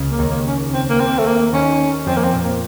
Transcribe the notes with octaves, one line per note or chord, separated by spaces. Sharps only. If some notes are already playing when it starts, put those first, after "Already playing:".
Already playing: C#2 C#3
A#3
D#2 D#3
A#3
C#4
C4
A#3
C4
A3
A#3
D#2 D#3 C#4
F2 F3 C4
A#3
C4
A#2
A#3